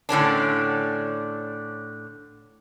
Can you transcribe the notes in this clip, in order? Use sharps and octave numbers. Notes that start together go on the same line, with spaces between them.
A2 D3 C#4 D4